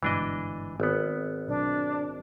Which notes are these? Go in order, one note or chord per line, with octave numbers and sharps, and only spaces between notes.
G1 G#2 B2 E3 D4 D#5
G#1 B3
B1 D4